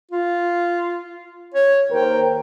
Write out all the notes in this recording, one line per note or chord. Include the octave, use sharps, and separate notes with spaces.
F4
C#5
D#2 A#4 C5 G5